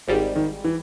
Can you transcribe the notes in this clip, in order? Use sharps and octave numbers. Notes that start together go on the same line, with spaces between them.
G#1 G#2 D#3 G3
D#3
E3